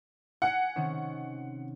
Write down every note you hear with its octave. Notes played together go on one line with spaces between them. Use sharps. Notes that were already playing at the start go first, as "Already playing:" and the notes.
F#5 G#5 F6
C3 D#3 C#4